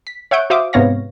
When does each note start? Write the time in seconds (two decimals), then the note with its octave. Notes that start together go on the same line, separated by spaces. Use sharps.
0.07 B6
0.31 C#5 E5 F#5 G6 D7
0.50 F#4 C5 E5 F5 D6 D#6
0.73 G#2 C3 B3 C#5 F5 A#6